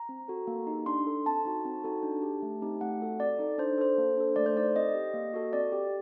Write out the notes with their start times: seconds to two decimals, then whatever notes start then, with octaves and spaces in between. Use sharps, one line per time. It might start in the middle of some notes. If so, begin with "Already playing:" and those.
Already playing: A#5
0.09 C4
0.28 F#4 A4
0.47 A#3
0.67 D#4 G4
0.86 D4 C6
1.07 A4
1.26 C4 A5
1.45 D#4 F#4
1.65 C4
1.84 D#4 F#4 A4
2.03 D4
2.22 G4
2.42 A3
2.62 C4 D#4 G4
2.81 A3 F#5
3.00 C4 F#4 A4
3.19 C4 D5
3.39 D#4 A4
3.58 D4 C5
3.78 A4 C5
3.98 A#3
4.17 D4 A4
4.36 A3 D5
4.46 C5
4.56 D#4 A4 D5
4.75 C4 D#5
4.95 G4
5.14 A#3
5.34 F#4 A4
5.53 C4 D5
5.72 G4